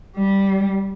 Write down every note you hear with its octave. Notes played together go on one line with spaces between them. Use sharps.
G3